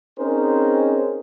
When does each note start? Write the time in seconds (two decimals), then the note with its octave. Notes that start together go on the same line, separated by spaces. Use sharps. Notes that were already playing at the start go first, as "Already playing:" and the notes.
0.18 C4 C#4 D#4 G#4 A#4 C5